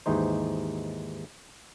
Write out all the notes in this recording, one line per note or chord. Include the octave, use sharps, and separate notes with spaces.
D#2 G#2 E3 D#4 C5